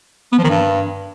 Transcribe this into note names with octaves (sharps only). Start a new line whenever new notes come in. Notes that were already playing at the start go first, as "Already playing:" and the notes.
B3
F3
D#3
G2